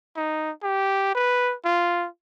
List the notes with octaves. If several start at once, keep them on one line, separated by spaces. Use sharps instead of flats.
D#4
G4
B4
F4